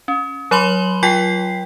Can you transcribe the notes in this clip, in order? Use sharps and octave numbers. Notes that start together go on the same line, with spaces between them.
C#4
F#3 C#5 B5 C6 F#7 G7
F#3 F4 G5 B6 C7